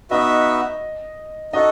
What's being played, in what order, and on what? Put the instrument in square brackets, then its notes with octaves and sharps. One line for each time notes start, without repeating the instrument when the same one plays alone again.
[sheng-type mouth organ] B3 D#4 F#4 B4 E5 [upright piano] D#5
[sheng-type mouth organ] D#4 F#4 A4 [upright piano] D#5